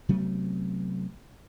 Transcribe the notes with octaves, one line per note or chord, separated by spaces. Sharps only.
C3 F#3 A3 B3